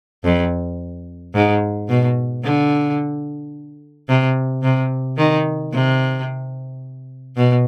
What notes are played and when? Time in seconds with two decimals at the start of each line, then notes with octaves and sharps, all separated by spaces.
0.24 F2
1.34 G#2
1.89 B2
2.44 D3
4.09 C3
4.63 C3
5.17 D#3
5.73 C3
7.37 B2